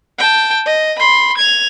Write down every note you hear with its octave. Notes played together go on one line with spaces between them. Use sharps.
G5 A5
D#5
B5 C6
G#6 F7